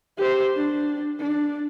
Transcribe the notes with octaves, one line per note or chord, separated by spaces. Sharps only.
G4 C5
D4
D4